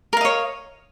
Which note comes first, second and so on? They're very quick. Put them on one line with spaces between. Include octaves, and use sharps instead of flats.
A#4 F5 D#5 C#5